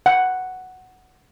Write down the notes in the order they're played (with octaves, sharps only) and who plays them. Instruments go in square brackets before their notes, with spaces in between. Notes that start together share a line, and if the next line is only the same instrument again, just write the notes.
[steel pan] F#5